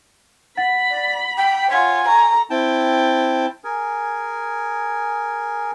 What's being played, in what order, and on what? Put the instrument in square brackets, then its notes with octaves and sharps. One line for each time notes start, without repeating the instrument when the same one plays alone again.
[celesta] F#5 A6 [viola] B5
[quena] D5
G5
[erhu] F4 [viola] C#5 [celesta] F#5 B6 [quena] G#5
[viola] A4 [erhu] A#5 [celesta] C#6
[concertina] C4 E4 G5 A5
G#4 A#4 G#5